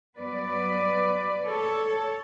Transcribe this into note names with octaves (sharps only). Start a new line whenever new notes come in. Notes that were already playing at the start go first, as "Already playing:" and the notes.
G2 F#3 B3 B4 D5
A4 C#5